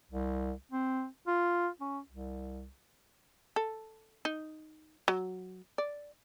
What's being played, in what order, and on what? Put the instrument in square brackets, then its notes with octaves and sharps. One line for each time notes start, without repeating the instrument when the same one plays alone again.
[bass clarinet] C2
C4
F4
C#4
C2
[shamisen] A4
D#4
F#3
D5